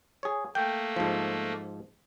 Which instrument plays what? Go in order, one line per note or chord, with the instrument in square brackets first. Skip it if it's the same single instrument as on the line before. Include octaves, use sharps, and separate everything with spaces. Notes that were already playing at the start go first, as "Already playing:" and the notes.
[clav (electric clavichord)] G#4 C#5
[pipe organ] A3 A#3 [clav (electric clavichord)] G5
[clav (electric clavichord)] G#2 F3